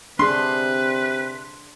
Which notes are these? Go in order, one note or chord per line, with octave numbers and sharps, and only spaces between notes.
C3 D4 G#4 B4 C6